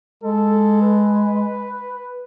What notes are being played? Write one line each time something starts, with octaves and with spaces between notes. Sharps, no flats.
G#3 A4
B4